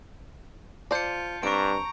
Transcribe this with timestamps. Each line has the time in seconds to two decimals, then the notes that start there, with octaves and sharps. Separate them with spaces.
0.91 F4 C5 D5 A5 G6 C#7
1.43 G2 C4 A#5 C#6 D7